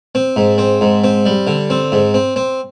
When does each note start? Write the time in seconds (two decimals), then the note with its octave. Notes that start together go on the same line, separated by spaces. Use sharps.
0.15 C4
0.36 G#2
0.58 C4
0.81 G#2
1.04 C4
1.26 G3
1.47 D3
1.70 C4
1.92 G#2
2.14 C4
2.36 C4